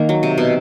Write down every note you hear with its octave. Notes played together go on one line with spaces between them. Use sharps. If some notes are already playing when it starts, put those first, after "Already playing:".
Already playing: D#3 A#3
F#3
C3
B2